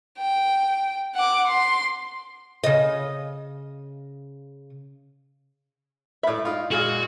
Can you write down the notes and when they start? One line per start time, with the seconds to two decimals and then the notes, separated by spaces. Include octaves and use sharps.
0.18 G5
1.15 F#5 D6
1.47 C6
2.64 C#3 D#5
6.23 A2 D5 E5 B5
6.45 D#4 F4 D#6
6.71 A#2 G#3 F#4